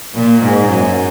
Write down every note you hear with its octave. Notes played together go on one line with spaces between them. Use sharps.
A#2
G#2
F#2